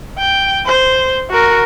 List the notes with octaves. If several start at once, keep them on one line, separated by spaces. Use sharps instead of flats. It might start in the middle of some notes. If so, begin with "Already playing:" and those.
G5
C5
F#4 A#4